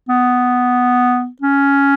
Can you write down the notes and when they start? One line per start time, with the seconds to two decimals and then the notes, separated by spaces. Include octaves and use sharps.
0.09 B3
1.41 C#4